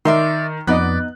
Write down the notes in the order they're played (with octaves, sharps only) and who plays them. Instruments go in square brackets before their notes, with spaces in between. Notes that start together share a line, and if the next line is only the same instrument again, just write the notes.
[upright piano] D#3 [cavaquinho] D5 E5 C6
[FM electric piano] F2 [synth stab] B3 D#4 D#5 [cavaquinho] D5 B5 [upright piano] F#6